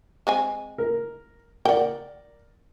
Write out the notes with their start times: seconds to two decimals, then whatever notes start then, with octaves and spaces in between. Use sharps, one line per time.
0.27 G#3 C4 G#5
0.78 A#4
1.65 A#4 D5 F#5 G5